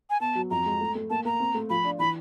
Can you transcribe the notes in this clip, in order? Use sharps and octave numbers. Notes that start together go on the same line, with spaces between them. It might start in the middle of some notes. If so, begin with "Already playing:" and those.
G#5
B3 A5
F#3
F2 A#5
G#3
A3
A3
A#3 A5
A#3 A#5
C4
A3
F3 B5
D4
E3 B5